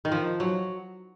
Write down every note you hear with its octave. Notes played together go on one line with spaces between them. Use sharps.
D#3
F3
F#3